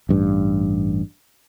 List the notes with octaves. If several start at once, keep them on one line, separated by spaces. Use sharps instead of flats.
A1 G2